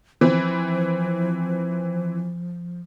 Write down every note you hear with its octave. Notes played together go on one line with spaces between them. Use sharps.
E3 F3 C4